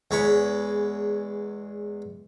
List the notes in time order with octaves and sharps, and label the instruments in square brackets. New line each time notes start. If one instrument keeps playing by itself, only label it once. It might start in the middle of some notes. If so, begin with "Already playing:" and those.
[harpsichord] E2 G#3 C#5 B5